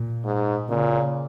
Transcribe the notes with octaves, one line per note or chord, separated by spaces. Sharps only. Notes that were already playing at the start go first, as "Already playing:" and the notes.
Already playing: A#2
G#2
A#2 C#3